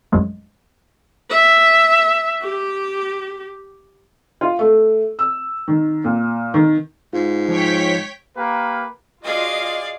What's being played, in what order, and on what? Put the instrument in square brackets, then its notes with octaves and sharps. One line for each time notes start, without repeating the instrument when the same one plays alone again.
[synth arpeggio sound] A#1 F#2 D#3 F#3 G#3 A3
[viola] E5
G4
[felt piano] F4
A3
E6
D#3
A#2
D#3
[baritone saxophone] G#2 [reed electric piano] F4
[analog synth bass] F3 [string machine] C#5 G5 B6
[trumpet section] A#3 G4 A#4 B4
[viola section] F4 F#4 D#5 [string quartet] G#4 D5 F5